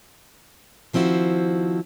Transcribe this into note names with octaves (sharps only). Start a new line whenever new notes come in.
D#3 F3 C4 E4 F#4